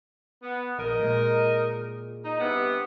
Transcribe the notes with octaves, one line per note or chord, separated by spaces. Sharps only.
B3
A#1 D#4 A#4 D#5
A#2 G#3
D#4
G2 C3 B3